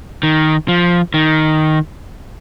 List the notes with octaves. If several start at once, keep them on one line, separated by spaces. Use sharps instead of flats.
D#3
F3
D#3